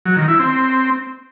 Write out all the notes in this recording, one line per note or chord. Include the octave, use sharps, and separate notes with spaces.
F#3
D#3
E4
C4